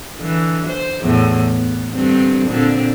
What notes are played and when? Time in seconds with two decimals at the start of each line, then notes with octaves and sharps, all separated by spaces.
0.19 D3 E3
0.67 C5
1.02 E2 A2
1.56 B3
1.92 G2 D3 C4
2.47 A#2 D3 C4